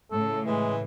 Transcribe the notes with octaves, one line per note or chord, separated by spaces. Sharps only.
A2 C#3 A4
E3 G#3